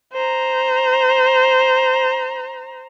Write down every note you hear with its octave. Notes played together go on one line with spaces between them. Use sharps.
C5 A#5